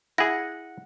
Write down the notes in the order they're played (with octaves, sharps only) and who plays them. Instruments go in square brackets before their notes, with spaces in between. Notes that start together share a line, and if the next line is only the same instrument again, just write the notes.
[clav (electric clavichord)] E4 G#4 [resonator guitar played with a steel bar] F#5 [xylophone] A#6